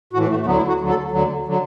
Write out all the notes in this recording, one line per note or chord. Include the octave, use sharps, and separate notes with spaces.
A2 E3 F#4
A3
A3
D2 D3 F#3 B3
E4
F#4
D2 D3 F#3
A4
D2 D3 F#3
D3 F#3